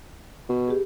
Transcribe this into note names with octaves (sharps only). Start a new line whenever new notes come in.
B2
G4 G#4